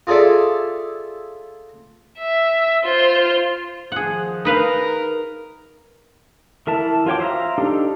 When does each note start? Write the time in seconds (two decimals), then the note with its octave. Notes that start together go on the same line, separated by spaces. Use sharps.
0.07 F4 G#4 A4 D5 E5
2.18 E5
2.85 F4 C5
3.92 D#3 F3 G#4 F#5
4.45 D#4 A#4 B4 F5
6.67 E3 A#4 E5 A5
7.06 F4 F#4 C#5 G5 D6
7.20 C5 E5 F5 A#5
7.58 D4 D#4 G4 A4